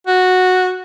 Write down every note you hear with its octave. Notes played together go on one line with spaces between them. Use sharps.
F#4